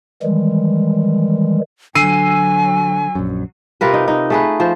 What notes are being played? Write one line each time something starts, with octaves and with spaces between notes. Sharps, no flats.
D#3 E3 G3 G#3
D3 F#3 G#5 E6 C7 D#7
A#1 F#2
C3 F4 A#4 B4
D#4
D#4
A3 G#4 B4
F3 C5